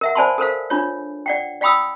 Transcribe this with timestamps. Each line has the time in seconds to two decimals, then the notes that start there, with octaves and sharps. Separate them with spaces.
0.01 A#4 E5 F#5
0.15 C5 D5 G#5 A5 B5 C6
0.38 A4 A#4 C5 F5
0.70 D4 F4 C#5
1.26 D5 F#5 G5
1.61 D5 F5 G5 B5 D#6 E6